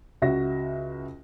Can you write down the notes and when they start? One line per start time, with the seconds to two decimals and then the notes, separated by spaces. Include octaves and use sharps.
0.22 C#2 F#4 E5 A#6